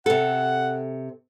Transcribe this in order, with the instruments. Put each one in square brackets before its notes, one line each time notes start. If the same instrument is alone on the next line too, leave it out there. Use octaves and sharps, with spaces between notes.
[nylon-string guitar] C3 A4 [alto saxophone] F#5